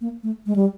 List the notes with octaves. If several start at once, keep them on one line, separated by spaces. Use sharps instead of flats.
A#3
A3
G#3
G3